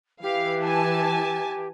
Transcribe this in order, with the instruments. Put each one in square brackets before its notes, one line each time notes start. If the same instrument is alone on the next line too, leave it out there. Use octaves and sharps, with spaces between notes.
[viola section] E3 [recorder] G4 [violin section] F5
[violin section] G#5 A5